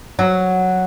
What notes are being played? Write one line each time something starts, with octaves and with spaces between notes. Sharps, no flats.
F#3